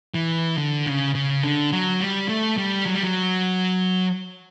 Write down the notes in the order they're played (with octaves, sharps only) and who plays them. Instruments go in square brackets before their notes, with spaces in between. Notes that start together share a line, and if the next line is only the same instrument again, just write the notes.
[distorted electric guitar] E3
D3
C#3
C#3
D3
F#3
G3
A3
G3
F#3
G3
F#3